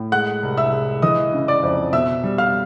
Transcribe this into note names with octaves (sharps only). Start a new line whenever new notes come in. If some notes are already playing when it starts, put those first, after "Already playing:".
Already playing: A2
G#3 F#5 F#6
C2
E5 E6
G#3
E3 D#5 D#6
C#3
D5 D6
F2
B2 E5 E6
G3
F5 F6